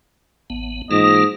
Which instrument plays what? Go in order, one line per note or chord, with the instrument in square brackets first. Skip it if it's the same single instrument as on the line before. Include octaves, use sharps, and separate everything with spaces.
[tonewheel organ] A1 B3
[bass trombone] G#2 [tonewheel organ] E3 A#3 F4 [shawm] D#5